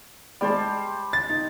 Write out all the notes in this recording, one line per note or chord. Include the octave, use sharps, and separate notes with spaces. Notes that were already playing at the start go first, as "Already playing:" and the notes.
G3 G#3 C5 D5 A5
A6
D#4